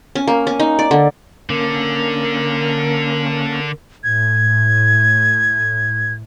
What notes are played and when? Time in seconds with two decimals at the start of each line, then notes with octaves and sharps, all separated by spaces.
0.15 C#4
0.27 A#3
0.47 C#4
0.60 D#4
0.79 D5
0.91 D3
1.50 D3 A#3 C#4 A#4
4.04 A2 G#6